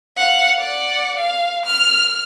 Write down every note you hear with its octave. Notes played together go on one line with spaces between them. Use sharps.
F5 F#5
D5 F#5
F5
F6